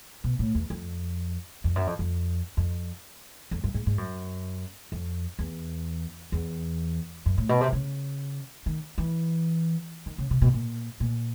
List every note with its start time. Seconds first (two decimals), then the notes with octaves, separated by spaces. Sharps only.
0.24 B2
0.39 A2
0.55 E2
0.70 F2
1.64 F2
1.76 F#2
1.87 F2
1.99 F2
2.57 F2
3.51 F2
3.64 F#2
3.74 G#2
3.86 G#2
3.98 F#2
4.92 F2
5.39 E2
6.32 E2
7.26 F#2
7.38 A2
7.49 B2
7.61 C3
7.73 C#3
8.66 D#3
8.98 E3
10.06 D#3
10.18 C#3
10.31 C3
10.42 B2
10.53 A#2
11.00 A#2